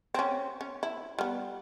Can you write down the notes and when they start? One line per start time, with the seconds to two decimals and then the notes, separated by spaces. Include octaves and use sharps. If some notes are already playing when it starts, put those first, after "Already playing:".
0.14 C4 C#4
0.61 C#4
0.83 E4
1.19 G3 B3